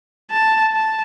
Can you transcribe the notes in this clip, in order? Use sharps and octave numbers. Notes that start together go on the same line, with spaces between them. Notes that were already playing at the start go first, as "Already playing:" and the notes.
A5
A5